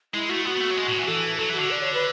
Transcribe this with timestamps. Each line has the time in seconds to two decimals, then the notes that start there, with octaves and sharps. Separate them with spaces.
0.14 G#3 E4
0.29 A3 F#4
0.45 B3 F#4
0.57 B3
0.61 A3
0.71 F#3
0.77 G#3
0.87 A2
0.98 E3
1.08 E3 A4
1.39 F#3 A4
1.50 E3 F#4
1.60 D3
1.70 D5
1.82 C#5
1.94 B4